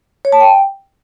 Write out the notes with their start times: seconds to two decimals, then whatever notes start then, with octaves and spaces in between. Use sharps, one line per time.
0.25 C#5
0.32 A5
0.40 G5